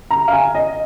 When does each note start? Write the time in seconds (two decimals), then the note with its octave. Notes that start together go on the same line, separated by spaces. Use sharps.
0.11 A#5
0.28 F5
0.33 G#5
0.55 D#5